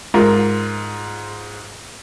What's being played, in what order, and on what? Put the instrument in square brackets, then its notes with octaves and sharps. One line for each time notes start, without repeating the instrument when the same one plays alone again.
[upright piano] G#2 F4 A#4